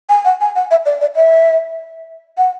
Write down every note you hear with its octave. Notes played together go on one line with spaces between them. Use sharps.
G#5
F#5
G#5
F#5
E5
D5
D5
E5
F#5